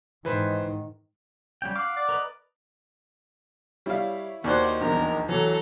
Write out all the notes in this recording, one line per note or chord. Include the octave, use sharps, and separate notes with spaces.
G#2 D#3 E3 B4 C5
G3 C#4 G5
F5 F#5 D6
D5
A#4 B4 D#5
G3 E4 C#5 F5
D#2 D#3 F#4 C5 D5 F#6
A#1 E2 G2 A#4
E3 F#3 A4 A#5